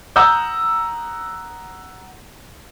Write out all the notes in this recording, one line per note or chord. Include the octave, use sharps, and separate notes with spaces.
F#5 A#5 D#6 E6 G6